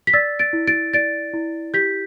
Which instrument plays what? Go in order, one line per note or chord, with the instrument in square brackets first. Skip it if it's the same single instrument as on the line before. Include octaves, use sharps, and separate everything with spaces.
[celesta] B6
D5 E6 A6
A6 D7
E4
A6 D7
D5 A6 D7
E4
G4 G6 B6